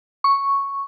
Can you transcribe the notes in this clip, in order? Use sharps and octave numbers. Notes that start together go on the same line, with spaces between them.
C#6